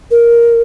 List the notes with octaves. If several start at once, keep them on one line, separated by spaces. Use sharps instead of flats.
A#4